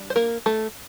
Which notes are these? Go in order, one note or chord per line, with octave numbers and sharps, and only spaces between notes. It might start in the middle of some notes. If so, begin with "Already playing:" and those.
Already playing: G3 D4
C5
A#3 A#4
A3 A4